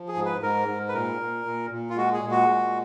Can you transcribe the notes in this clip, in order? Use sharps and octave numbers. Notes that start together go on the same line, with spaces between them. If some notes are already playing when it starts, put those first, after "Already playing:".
Already playing: F3
G#4
G#2
B4
G#2 A#4
G#2
B4
A#2 A#4
A#2
A#2
A#2
F4
G#3 F#4
G#4
A#2
F#4
G#3